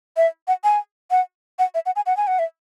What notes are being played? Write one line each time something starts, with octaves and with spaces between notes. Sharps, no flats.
E5
F#5
G#5
F#5
F#5
E5
F#5
G#5
F#5
G#5
F#5
E5